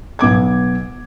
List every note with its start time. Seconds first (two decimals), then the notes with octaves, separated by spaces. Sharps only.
0.19 B1 B3 D6 G#6